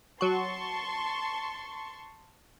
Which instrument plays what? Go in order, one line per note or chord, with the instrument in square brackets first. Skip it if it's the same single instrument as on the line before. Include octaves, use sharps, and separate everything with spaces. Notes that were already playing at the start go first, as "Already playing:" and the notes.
[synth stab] F#3 F#4 [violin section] A5 C6 C#6